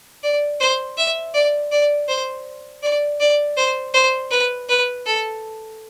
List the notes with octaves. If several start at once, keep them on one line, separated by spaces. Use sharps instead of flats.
D5
C5
E5
D5
D5
C5
D5
D5
C5
C5
B4
B4
A4